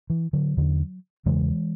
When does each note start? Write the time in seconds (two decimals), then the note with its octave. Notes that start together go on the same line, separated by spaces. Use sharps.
0.10 E3
0.33 D3 F#3
0.57 E2 D3
1.26 E2 C#3 E3 G#3